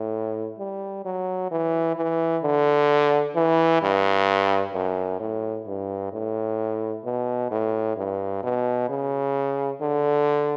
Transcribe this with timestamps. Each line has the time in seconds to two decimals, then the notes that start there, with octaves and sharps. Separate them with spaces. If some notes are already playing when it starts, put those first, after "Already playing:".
Already playing: A2
0.59 G3
1.05 F#3
1.51 E3
1.96 E3
2.43 D3
3.35 E3
3.82 G2
4.74 F#2
5.20 A2
5.67 G2
6.12 A2
7.05 B2
7.51 A2
7.97 G2
8.43 B2
8.89 C#3
9.81 D3